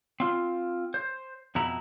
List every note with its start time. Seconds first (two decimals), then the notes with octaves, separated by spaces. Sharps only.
0.20 C4 F4
0.94 C5
1.55 F2 B2 E4 A#5